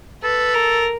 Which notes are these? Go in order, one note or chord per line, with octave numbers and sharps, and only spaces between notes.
A4 B4
A#4